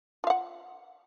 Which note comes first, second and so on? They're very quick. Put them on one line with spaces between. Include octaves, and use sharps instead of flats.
F4 F5 F#5